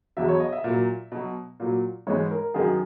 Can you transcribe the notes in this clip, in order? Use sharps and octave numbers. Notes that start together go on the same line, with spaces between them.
E2 B2 F#3 E5
C#5
D#5
E5
A#2 F#3
B2 F#3
A#2 F#3
G#2 E3 G#3 C#5
A#4
F#2 D#3 F#3 G#4